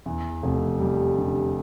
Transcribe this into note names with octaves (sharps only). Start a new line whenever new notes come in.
E2
F1
G3
D3